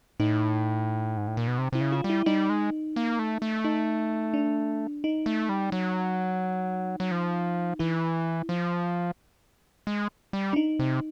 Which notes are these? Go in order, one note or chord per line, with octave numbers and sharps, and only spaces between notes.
A2 D#4
G#2
A2
A#2
B2
C3
C3 E4
C#3
F4
G3
E4
G3 D#4
G#3
A#3
A3
A3
D#4
D4
D#4
A3
G3
F#3
F#3
F3
E3 E4
F3
G#3
G3
D4
D#4
C3